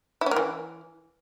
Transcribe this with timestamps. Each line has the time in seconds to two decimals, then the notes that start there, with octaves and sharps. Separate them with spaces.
0.21 E4
0.26 C#4
0.31 A#3
0.36 E3